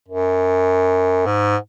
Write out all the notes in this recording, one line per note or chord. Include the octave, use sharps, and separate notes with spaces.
F#2
G#2